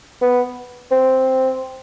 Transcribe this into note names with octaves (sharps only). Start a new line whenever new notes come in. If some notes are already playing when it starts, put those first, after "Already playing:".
B3
C4